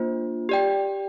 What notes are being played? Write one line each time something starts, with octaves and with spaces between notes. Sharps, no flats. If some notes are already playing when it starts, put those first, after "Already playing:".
Already playing: A#3 D4 F4 C5
G4 D5 G5